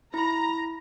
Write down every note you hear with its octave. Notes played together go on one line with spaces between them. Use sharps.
E4 A#5 B5